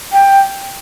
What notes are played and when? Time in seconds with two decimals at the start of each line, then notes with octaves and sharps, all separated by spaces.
0.12 G5